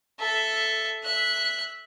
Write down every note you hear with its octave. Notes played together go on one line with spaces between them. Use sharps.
A4 E5
E5 F#6